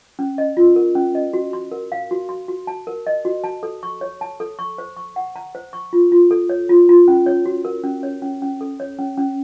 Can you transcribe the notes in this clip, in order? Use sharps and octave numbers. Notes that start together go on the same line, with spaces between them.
C#4
D#5
F4
A#4
C#4
D#5
F#4
C6
A#4
F5
F#4
C6
F#4
A5
A#4
D#5
F#4
A5
A4
C#6
C#5
A5
A4
C#6
C5
C#6
F#5
A#5
C5
C#6
F4
F4
A4
C#5
F4
F4
C#4
C#5
F#4
A#4
C#4
C#5
C#4
C#4
A4
C#5
C#4
C#4